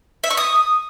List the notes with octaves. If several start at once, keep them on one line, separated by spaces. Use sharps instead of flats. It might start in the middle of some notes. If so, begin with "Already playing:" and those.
E5
C#6
D#6